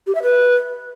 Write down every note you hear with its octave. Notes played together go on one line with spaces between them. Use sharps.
G4
E5
B4